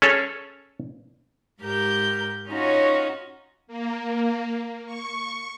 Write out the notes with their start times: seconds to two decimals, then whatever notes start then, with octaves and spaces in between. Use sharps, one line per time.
0.02 C#4 G#4 A4 C#5
1.60 G#2 G4 A#4 G6
2.48 C#4 D#4 F4 F#4 C#5
3.67 A#3
4.86 C#6